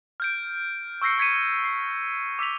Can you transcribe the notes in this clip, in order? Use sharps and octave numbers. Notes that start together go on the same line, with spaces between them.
F6 G6 D7
C#6 E6 G6 A#6 C7 C#7
C#6 G#6 B6 C#7 D#7
C7
D6 E6 B6 F7